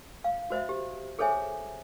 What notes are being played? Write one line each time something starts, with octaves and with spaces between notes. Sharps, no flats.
F5
F#4 C5 D#5 E5
G4
G#4 A4 C5 C#5 E5 G#5